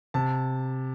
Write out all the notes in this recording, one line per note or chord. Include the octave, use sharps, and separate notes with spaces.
C3 A5